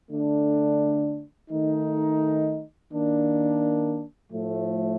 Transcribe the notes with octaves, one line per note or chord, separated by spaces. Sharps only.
D3 A3 D4
D#3 A3 D#4
D#3 A#3 D4
A2 F3 A3